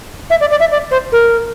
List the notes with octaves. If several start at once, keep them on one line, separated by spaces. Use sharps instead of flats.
E5
D5
D5
E5
D5
C5
A#4